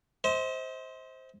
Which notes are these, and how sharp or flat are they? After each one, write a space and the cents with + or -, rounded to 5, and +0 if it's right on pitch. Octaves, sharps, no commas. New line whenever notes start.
C5 +0 D#5 +45